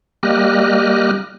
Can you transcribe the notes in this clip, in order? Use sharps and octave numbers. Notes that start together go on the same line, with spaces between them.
G3 A#3 G4 D#5 F6 F#6